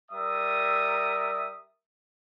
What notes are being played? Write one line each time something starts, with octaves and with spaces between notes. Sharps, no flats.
G3 A#4 E5 D#6